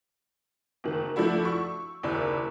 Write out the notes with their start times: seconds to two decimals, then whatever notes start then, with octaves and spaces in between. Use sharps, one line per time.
0.84 F#1 D#3
1.16 F3 A3 D4 E4 F#4
1.45 C#6 E6
2.03 F#1 D#2 E4 D5